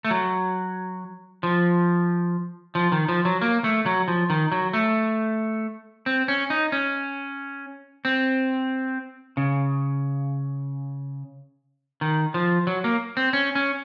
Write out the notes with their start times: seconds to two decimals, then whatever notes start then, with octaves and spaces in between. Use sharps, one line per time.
0.05 A3
0.11 F#3
1.43 F3
2.75 F3
2.92 D#3
3.08 F3
3.25 F#3
3.41 A#3
3.64 A3
3.86 F#3
4.08 F3
4.30 D#3
4.52 F#3
4.73 A3
6.06 C4
6.28 C#4
6.50 D#4
6.72 C#4
8.05 C4
9.37 C#3
12.01 D#3
12.34 F3
12.67 F#3
12.84 A#3
13.17 C4
13.33 C#4
13.55 C#4